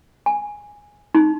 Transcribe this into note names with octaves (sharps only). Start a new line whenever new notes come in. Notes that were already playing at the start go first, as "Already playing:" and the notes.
G#5
D#4